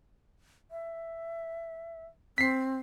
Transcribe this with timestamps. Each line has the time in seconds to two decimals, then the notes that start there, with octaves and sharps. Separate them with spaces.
0.71 E5
2.38 C4 B6 C7